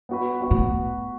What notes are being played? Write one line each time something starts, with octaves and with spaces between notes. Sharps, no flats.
B3 F#4 B4
B3 F#4 B4
A2